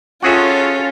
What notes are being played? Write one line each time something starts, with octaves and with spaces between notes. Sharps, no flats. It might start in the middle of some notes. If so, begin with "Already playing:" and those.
C#4 F4 F#4 G#4 A4 E5